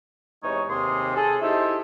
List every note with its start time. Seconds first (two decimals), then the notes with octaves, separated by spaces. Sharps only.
0.43 E2 C3 G#3 D#4 C#5
0.69 D#2 C3 G#4 C6
1.16 G#4 A4
1.42 D#4 E4 G4 A4 C5 E5